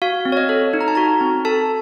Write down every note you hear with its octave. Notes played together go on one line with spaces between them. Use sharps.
F#4 F5
C4
C#5
D#5
A4
D#4
A#5
A5
F#4 A#5
C4
A4 A5